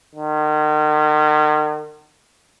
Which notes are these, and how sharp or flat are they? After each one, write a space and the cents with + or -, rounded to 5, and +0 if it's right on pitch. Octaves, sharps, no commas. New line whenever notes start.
D#3 -40